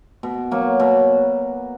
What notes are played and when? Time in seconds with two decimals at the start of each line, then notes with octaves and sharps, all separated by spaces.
0.23 B2
0.51 F#3 A#3
0.80 B2